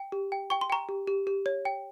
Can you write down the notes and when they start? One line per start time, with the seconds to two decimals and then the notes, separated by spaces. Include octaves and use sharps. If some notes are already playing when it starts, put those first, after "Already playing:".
Already playing: G5
0.12 G4
0.32 G5
0.50 G5 C#6
0.61 C6
0.70 G5 A#5 C#6
0.89 G4
1.07 G4
1.27 G4
1.46 C#5
1.65 G5